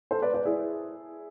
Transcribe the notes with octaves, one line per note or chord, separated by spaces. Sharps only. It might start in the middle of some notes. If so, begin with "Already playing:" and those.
A4 C5
B4 D5
B4 D5
E4 G#4